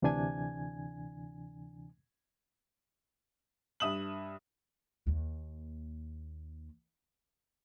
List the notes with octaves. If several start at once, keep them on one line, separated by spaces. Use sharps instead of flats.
D2 C3 E3 D4 G#5 G#6
G2 E5 D#6 E7 F#7
D#2 A#3